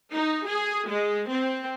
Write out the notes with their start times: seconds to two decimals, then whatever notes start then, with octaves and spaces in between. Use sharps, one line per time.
0.12 D#4
0.45 G#4
0.88 G#3
1.30 C4